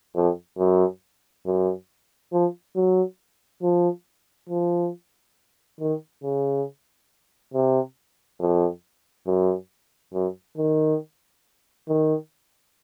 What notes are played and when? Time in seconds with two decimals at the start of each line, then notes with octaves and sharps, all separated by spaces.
0.16 F2
0.58 F#2
1.46 F#2
2.33 F3
2.76 F#3
3.63 F3
4.49 F3
5.80 D#3
6.23 C#3
7.54 C3
8.40 F2
9.27 F#2
10.14 F#2
10.58 D#3
11.88 D#3